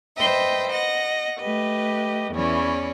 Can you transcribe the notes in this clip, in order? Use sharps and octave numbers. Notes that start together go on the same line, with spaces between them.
B4 C5 D#5 E5 G5
D#5 F#5 A#6
A3 G4 B4 D#5
E2 E3 C#4 C#5 D5